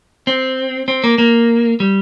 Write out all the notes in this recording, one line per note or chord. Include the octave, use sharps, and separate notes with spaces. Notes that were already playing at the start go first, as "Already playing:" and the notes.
C4
C4
A#3
A#3
G3